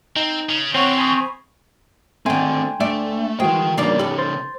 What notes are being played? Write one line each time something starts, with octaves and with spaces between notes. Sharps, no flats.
C4 D#4
C#3 C#4
D3 E3 C4 C#5 F#5 C#6
G#5 B5 D#6
D3 D#3 A3 C4 G5 G#5 C6
D2 A3 D5 E5
E3 G#3 F#4 A#4 C5 G5
C#3 A#3 D4 D#4 D5
G4 A4 B4
C5 C6 A6